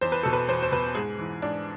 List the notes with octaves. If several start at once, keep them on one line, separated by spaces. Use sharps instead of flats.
E2 C5
B4
B2 A4
B4
E2 C5
C5
B2 B4
G#2 G#4
E3
G#2 D4